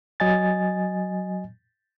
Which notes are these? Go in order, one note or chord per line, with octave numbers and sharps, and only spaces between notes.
F#3 D#5 G#5 A6